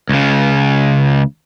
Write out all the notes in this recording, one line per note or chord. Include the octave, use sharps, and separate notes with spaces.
C#2 C#3